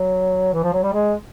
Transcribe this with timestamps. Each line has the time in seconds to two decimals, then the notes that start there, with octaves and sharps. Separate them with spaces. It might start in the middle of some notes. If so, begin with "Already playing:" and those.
Already playing: F#3
0.53 E3
0.63 F3
0.73 F#3
0.83 G3
0.93 G#3